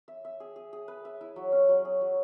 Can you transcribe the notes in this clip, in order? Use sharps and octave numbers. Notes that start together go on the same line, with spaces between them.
E5
E5
G#4
G#4
G#4
B4
E5
E4
F#3
C#4
F#3
G#4
F#3